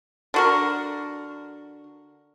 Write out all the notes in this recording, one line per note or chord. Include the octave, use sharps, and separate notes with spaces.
D3 F#4 A#4